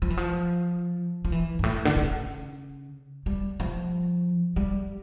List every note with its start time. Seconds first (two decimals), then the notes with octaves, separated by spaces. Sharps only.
0.02 F3
0.10 E3
0.17 F3
1.25 F3
1.32 E3
1.59 G2
1.63 A2
1.85 D3
1.96 C#3
3.26 G3
3.60 F3
4.56 G3